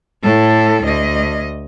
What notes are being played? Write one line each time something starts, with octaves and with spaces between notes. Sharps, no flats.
A2 A4
D2 D#5